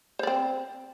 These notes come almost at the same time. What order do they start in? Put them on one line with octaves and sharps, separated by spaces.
C5 D5 C4